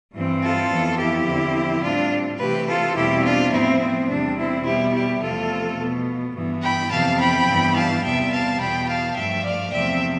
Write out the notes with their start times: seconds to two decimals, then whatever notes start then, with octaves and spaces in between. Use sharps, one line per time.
0.13 G2 E3 G3 C4
0.41 F4 A4
0.70 F2 E3 B3
0.98 E4 G4
1.26 E2 D3 F3 C4
1.83 A2 G3 C4 D4 F4
2.39 C3 E3 A3 C4 G4 B4
2.67 F4 A4
2.95 E2 B2 G3 C4 E4 G4
3.24 D4 F4
3.52 A2 F3 B3 C4 E4
3.80 C4
4.09 E2 C3 G3 C4 D4
4.37 C4 E4
4.65 B2 G3 B3 E4 G4
4.93 E4 G4
5.22 E2 C3 F3 A3 C4 F4 A4
5.78 B2 B3
6.35 G2 E3 B3
6.62 G5 B5
6.91 F2 C3 E3 B3 F5 A5
7.19 G5 B5
7.47 G2 E3 B3
7.75 F5 A5
8.03 E2 C3 G3 B3 E5 G5
8.32 F5 A5
8.60 E2 B2 B3 G5 B5
8.88 F5 A5
9.16 G2 F3 A3 E5 G5
9.45 D5 F5
9.73 E2 C3 F3 A3 C4 E5 G5